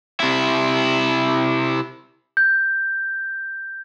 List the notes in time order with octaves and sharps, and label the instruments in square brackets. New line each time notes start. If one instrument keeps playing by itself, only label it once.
[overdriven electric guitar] C3 E4
[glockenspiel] G6